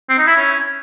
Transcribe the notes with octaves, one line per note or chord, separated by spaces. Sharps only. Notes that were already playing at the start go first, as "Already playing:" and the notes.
C4
D#4
E4
C#4